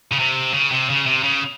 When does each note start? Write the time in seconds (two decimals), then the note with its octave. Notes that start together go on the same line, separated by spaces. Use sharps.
0.12 C#3
0.19 C3
0.53 C#3
0.71 C3
0.89 C#3
1.06 C3
1.23 C#3